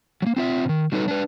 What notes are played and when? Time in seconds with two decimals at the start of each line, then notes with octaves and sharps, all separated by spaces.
0.22 F#3 A#3
0.36 C4 F4 E5
0.65 B2 D#3
0.92 F#3 G3 D#4 A4 B4
1.08 D4 B4